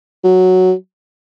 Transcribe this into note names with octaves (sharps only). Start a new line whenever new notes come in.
F#3